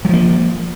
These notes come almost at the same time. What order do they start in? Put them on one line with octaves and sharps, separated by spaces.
F#3 F3 A#3